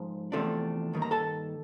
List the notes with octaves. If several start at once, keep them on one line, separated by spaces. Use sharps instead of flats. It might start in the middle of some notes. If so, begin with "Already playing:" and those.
Already playing: G#2 F3
E2 C3 F3 A3 D4
G2 D#3 A#3
A#5
A4 A5